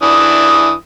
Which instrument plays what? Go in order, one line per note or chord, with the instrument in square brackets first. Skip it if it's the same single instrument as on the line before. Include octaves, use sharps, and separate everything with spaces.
[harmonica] E3 D4 D#6